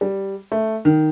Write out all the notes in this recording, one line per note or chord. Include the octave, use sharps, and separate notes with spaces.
G3
A3
D#3